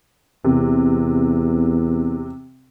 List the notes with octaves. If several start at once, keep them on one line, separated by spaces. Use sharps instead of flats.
E2 C3